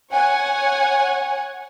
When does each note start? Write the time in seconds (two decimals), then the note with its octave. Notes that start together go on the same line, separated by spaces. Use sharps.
0.13 C#5 F#5 G#5